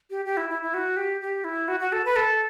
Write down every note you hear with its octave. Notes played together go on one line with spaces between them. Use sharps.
G4
G4
E4
E4
E4
F#4
G4
G4
E4
F#4
F#4
A4
B4
A4